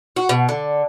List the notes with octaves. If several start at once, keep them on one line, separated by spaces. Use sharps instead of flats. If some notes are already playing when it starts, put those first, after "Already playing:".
F#4
B2
D3